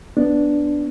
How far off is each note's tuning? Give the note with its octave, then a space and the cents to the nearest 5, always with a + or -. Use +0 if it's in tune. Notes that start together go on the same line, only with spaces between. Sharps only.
B3 +0 D4 -5